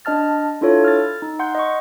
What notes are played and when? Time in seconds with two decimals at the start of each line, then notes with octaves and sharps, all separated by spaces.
0.05 D4 D#5 A5 F6 A6
0.61 D4 E4 F4 A4 C#5
0.84 F6 A6
1.22 D#4
1.39 F#5 C6 G6
1.55 D#5 C#6